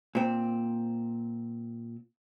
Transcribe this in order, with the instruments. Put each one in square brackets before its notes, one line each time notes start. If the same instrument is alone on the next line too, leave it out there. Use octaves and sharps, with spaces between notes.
[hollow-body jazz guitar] A#2 C4